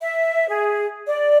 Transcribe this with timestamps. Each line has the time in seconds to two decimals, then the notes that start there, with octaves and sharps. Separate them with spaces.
0.02 E5
0.48 G#4
1.08 D5